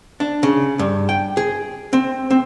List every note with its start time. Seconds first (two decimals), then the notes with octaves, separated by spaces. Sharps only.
0.20 D4
0.43 C#3
0.79 G2
1.09 G5
1.37 G#4
1.93 C4
2.31 C4